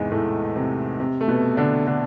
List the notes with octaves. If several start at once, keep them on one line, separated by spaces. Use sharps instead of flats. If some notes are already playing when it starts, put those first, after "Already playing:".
Already playing: E2 G#2 C3 E3 G#3
A2 A3
C3
C3
A3
B2 B3
D3 D4
D3 D4